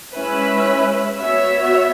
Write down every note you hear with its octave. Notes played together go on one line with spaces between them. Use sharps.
G#3 C#4 E4 B4 E5
B3 F#4 C#5 E5